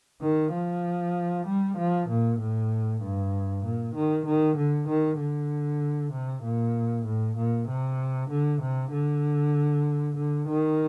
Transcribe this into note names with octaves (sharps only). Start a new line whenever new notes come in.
D#3
F3
G3
F3
A#2
A2
G2
A#2
D#3
D#3
D3
D#3
D3
C3
A#2
A2
A#2
C3
D3
C3
D3
D3
D#3